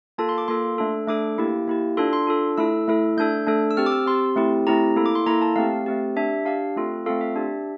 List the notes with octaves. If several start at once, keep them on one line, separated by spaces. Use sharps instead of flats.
A#3 F4 A4 A5
C6
D6
A#3 F4 A4 C6
A3 D4 A4
A3 D4 A4 D6
A#3 E4 G4
A#3 E4 G4
D4 F4 A4 C6
C6
D4 F4 A4
A3 E4 A4 E6
A3 E4 A4
A3 D4 A4 G6
A3 D4 A4
E6
C4 G4 F6
D6
E6
C4 G4 C6
A3 C4 E4 G4
A3 C4 E4 G4 A#5
A#3 E4 A4
D6
C6
A#3 E4 A4 A#5
A5
A3 C4 G4 F5
A3 C4 G4
D4 G4 E5
D4 G4 F5
A3 C4 F4 A4
A3 C4 F4 A4 F5
E5
D4 G4